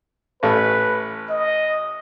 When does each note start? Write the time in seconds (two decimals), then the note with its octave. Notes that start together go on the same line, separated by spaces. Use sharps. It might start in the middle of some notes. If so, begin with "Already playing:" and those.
0.43 A1 A3 B4
1.30 D#5